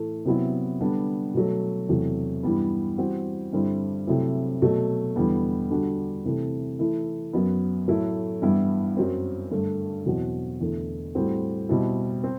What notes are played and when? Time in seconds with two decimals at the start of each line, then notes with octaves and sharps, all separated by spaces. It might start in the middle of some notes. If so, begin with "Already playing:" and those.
Already playing: A2 E3 A3
0.25 C3 F#3 B3 E4
0.80 D3 G3 B3 D4
1.34 B2 F#3 A3
1.89 E2 C3 F#3 A3
2.43 G2 E3 G3 B3
2.98 E3 G3 C4 F#4
3.53 G2 D3 G3 C4 E4
4.07 C3 F#3 A3 C4 E4
4.62 B2 F#3 A3
5.16 E2 D3 G3 B3
5.70 D3 G3 D4 F#4
6.25 C3 E3 A3
6.79 E3 A3 E4
7.33 F#2 F#3 B3
7.88 A2 F#3 A3 E4
8.42 G2 E3 G3 B3 E4
8.97 F#2 F#3 C4
9.51 G2 D3 A3
10.06 E2 B2 F#3 C4 F#4
10.61 E2 D3 A3 E4
11.15 A2 G3 C4 F#4
11.69 B2 G3 C4 E4
12.24 C4